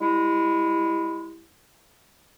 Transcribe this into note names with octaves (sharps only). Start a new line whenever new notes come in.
G3 G#3 E4